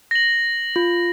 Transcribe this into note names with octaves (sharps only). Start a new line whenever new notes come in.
A#6 F#7
F4